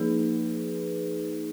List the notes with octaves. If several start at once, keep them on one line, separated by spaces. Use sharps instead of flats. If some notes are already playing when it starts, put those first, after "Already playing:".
Already playing: F3 A#3 D#4 G#4 B4